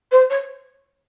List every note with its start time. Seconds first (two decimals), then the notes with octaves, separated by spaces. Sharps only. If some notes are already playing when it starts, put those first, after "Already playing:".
0.12 C5
0.30 C#5